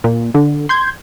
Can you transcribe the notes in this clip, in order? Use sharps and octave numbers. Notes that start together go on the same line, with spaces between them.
A#2
D3
C6 G6 G#6